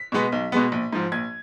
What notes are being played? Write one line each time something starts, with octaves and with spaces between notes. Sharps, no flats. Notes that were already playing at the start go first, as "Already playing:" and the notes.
Already playing: B6
B2 G#3 B3
B1
B2 G#3 B3
A#1
G#2 F3
A#1 G#6